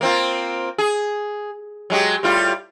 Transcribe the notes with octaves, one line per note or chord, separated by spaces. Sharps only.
A#3 C4 F4
G#4
F#3 G#3 G4
A2 G3 F4